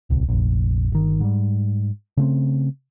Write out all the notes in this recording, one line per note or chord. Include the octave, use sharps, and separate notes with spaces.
D1 C2
F1 A#1
G1 D#3
G#2 G3
C#3 A3 C4